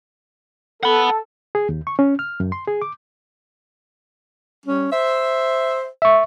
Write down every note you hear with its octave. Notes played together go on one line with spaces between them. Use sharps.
A4 F#5 B5
G#4
D#2
C#6
C#4
F6
F#2
C6
G#4
D6
G3 C#4
C5 E5
E5 C#6